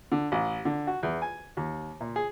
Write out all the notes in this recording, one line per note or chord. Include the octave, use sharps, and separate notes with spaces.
D3
A1
D3
F#4
E2
G#5
D#2
A#2
G#4